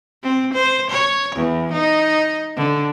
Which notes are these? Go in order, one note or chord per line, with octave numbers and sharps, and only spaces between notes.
C4
C5
C#5
E2
D#4
D3